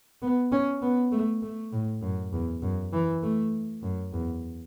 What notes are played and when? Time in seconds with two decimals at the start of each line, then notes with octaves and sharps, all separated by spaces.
0.22 B3
0.52 C#4
0.82 B3
1.12 A3
1.43 A3
1.73 A2
2.02 F#2
2.32 E2
2.62 F#2
2.93 E3
3.23 A3
3.83 F#2
4.13 E2